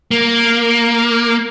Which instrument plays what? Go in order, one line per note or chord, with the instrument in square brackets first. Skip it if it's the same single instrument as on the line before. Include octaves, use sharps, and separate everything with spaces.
[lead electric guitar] A#3